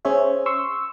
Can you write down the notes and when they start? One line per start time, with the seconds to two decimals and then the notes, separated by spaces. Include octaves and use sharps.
0.05 C#4 G#4 C5 C#5 E5
0.46 C6 C#6 E6